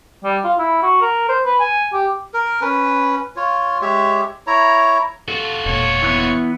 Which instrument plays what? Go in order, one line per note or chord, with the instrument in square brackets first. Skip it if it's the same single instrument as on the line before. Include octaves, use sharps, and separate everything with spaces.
[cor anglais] G3
F4
E4
F#4
A#4
C5
B4
G#5
G4
[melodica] A#4
C#4 B4
F4 C#5
G#3 G4 C#5 E5
E4 C#5 A#5
[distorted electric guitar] F4 F#4 [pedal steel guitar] A4
[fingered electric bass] E1 A#2 [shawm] C#5
[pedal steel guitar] E3 B3 F#6